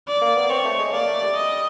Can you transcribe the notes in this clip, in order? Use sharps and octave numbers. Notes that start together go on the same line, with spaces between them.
D5
A#3
B3
C4 C#5
A3
G#3
A#3 D5
A3
G3
D#5